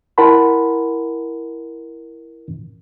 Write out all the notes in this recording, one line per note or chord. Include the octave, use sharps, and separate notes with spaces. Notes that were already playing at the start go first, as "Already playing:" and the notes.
E4 A#4 F#5 A5 B5 C6